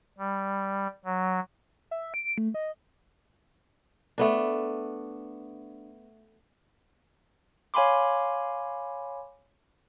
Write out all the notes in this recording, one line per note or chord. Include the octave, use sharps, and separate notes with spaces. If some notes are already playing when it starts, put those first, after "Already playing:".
G3
F#3
E5
D7
A3
D#5
A3 B3 D4
C#5 F5 G#5 B5 C6 D6